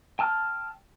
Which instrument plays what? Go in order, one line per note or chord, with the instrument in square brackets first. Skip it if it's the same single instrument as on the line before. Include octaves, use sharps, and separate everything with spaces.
[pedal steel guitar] G5 A5 E6 F6